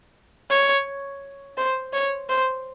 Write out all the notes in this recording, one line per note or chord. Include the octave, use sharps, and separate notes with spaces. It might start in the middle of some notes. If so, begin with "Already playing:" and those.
C#5
C5
C#5
C5